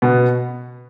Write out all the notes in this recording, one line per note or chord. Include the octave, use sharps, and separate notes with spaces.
B2 B3